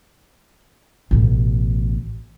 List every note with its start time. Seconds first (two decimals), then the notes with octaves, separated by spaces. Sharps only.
1.11 A1 B2